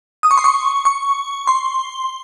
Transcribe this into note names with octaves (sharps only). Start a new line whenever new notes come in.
D#6
C#6
C6
C#6
C#6
C6